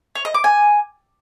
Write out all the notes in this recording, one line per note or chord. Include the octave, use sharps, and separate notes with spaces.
C#5
D#5
D6
G#5